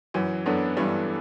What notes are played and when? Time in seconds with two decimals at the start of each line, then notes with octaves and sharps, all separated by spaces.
0.14 F#2 E3
0.46 F#2 B3 D4 A4
0.77 G2 E3